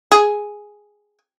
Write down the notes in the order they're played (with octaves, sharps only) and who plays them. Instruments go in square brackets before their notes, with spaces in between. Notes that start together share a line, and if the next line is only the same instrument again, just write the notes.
[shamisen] G#4